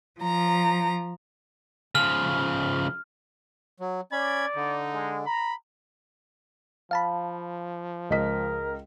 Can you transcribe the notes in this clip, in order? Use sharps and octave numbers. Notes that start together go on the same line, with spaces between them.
F3 A#5
C#3 F3 F6
F#3
C#4 D5 B5 G#6
D3 D#4
G#3
A#5 B5
F3 F5 A5 B5
C#2 A#4 D#5 B6